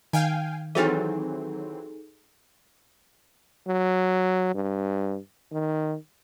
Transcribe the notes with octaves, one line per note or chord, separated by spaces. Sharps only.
D#3 F5 G5 G#5
E3 F#3 C4 D#4 G#4 A4
F#3
G2
D#3